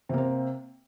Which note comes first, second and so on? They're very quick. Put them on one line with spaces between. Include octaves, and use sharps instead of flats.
C3 A#3 C4